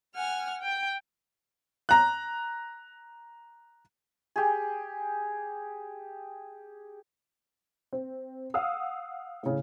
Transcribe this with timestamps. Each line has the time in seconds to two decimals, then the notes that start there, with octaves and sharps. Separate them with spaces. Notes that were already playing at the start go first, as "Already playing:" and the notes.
0.15 F#5 G#5 F6
0.60 G5
1.89 A#5 F#6
4.36 G4 G#4
7.93 C4
8.54 F5 F#5 D#6 E6
9.43 A2 C#3